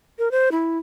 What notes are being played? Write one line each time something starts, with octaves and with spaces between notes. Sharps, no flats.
A#4
C5
E4